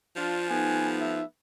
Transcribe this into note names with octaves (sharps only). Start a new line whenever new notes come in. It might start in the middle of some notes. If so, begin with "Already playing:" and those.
F3 D4 F4
G3 A3 B3 D#4 G#5
E5